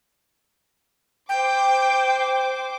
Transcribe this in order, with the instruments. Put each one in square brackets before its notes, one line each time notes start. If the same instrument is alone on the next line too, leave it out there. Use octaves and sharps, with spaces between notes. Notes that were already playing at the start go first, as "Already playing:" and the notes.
[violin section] C5 D6 [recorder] G5